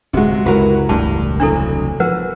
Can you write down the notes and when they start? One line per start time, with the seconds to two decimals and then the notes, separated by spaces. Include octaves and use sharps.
0.13 D1 C3 F#3 G#3 F#4
0.46 C#2 F#2 F#3 E4 F#4 G4 A#4 B4
0.89 E1 C#2 G2 A3 A5
1.40 C3 F#3 D4 E4 A4
2.00 F3 B3 F#4 A#4 B4 F#5